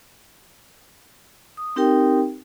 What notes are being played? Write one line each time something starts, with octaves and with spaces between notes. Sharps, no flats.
D#6
C4 D#4 G4 A#4 G5